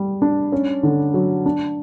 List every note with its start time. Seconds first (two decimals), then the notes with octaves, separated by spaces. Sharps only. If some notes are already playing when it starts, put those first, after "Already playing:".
Already playing: G3
0.22 D4
0.52 C#4
0.83 D3
1.14 F#3
1.46 D4